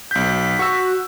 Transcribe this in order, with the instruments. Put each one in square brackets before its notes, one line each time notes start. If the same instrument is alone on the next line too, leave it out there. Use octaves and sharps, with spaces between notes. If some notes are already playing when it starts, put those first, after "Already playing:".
[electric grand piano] B1 G6 [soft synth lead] B6
[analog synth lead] F#4 [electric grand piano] C#6 E6